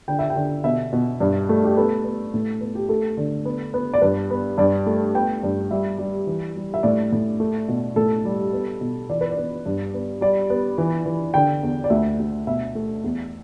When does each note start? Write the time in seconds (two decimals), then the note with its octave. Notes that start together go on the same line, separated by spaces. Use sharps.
0.08 D3 G5
0.19 E5
0.30 G5
0.36 D3
0.64 B2 E5
0.93 B2
1.20 G2
1.49 A3
1.64 G4
1.77 B3 A4
2.04 B3
2.34 A2
2.61 B3
2.75 G4
2.89 A3 A4
3.17 D3
3.45 B3
3.74 B3
3.94 D5
4.01 G2 B4
4.30 B3
4.58 G2 D5
4.86 A3
5.15 B3 G5
5.43 G2
5.71 G3 E5
5.99 G3
6.27 E3
6.56 G3
6.74 E5
6.83 A2 D5
7.12 A2
7.40 A3
7.68 B2
7.96 A2 A4
8.25 G3
8.53 B3
8.81 B2
9.09 E3 D5
9.21 B4
9.31 D5
9.37 B3
9.66 G2
9.94 B3
10.21 G3 D5
10.50 B3
10.78 E3
11.06 E3
11.34 D3 G5
11.63 E2
11.84 D5
11.90 D2 E5
12.19 D2
12.47 B2 E5
12.75 A3
13.04 E2